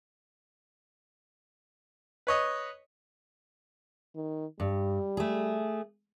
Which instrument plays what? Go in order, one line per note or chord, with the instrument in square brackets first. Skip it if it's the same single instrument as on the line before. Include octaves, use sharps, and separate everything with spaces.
[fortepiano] B4 C#5 D#5
[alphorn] D#3
[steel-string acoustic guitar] G2 [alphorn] G3
[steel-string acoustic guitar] A3 G#4